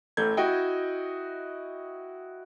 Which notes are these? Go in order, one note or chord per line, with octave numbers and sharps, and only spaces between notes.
A1 A3 G6 G#6
E4 F#4 D#5 G5